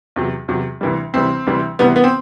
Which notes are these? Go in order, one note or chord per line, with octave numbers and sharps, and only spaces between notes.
E2 C3 F#3
E2 C3 F#3
D2 C3 E3 G3
D2 C3 E3 G3 C4
D2 C3 E3 G3
D2 C3 E3 G3 B3
B3
C4